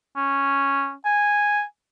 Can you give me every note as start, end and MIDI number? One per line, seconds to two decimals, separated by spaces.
0.16 0.93 61
1.05 1.63 80